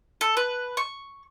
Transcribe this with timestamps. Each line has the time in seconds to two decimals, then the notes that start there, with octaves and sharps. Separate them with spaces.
0.21 A4
0.37 B4
0.77 C#6